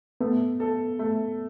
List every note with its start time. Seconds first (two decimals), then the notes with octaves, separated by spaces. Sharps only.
0.21 A3 B3
0.60 A4
0.99 A3